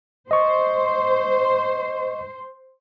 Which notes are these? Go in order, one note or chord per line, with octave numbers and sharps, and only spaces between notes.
C5 D#5 C#6